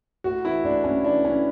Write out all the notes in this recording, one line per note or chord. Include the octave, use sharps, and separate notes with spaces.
A2 F#4
E3 E4
A2 D4
A2 C#4
E3 D4
E3 C#4